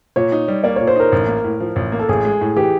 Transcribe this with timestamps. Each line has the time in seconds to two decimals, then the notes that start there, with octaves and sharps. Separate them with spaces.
0.16 A#2 C#5
0.32 D#4
0.48 G3
0.64 A#3 D5
0.76 A#2 C#5
0.87 C5
0.96 D#4 A#4
1.12 A1
1.28 A#3
1.44 A2
1.60 F3
1.76 A1
1.92 A#3
1.99 A4
2.09 A1 G#4
2.25 G#3
2.41 A2
2.56 E3 G4